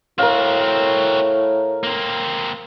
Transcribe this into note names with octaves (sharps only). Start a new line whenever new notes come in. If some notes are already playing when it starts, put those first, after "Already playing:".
A2 C4 F#4 A#4 F5
A#3 C4